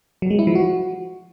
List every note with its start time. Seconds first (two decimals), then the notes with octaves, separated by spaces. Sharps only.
0.22 F#3
0.31 G#3
0.39 E4
0.47 F3
0.55 F#4